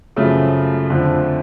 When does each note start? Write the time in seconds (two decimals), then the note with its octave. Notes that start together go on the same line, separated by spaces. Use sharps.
0.16 F#2 C#3 F3 A3
0.90 F2 D3 F3